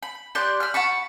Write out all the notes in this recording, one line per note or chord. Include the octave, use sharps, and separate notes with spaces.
B5
G4 D5 C6 F#6
B5 F6
F#5 A5 B5 C#6